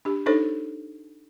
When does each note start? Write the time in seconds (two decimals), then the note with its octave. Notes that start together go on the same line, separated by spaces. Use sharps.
0.05 D4 G4
0.26 D4 D#4 A4 C5 C#5